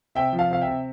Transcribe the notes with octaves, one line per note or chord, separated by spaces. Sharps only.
C3 E5 G5
F3
F5 A5
C3 F5
E5 G5
C3